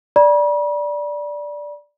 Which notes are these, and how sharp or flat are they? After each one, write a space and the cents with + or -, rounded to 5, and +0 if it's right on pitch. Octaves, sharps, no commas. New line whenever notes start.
D5 +0 B5 -45